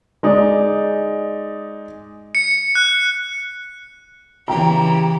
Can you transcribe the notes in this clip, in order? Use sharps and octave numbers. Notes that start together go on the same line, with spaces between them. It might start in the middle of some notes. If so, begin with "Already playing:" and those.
G#3 D#4 D5
C#7
F#6
C#3 E3 G4 G5 A#5